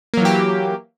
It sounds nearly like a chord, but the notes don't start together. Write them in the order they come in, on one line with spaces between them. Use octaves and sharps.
A#3 F#3 E3 G4